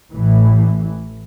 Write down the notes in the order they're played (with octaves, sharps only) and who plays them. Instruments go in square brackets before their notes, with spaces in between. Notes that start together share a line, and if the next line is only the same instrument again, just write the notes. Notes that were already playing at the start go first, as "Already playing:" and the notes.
[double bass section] A1 A2 E3